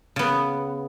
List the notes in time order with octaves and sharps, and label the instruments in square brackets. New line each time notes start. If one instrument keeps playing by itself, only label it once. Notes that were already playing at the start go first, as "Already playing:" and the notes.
[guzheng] C#3 B3